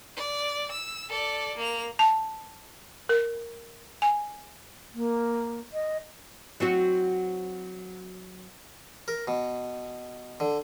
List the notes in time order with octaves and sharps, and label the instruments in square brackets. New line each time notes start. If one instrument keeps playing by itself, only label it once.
[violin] D5
E6
A4 D5
A#3 F7
[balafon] A5
A#4
G#5
[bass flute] A#3
D#5
[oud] F#3 C4 F#4
[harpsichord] A#4
B2
D3